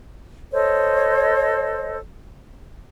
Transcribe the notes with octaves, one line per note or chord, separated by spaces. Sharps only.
A4 C5 C#5 D#5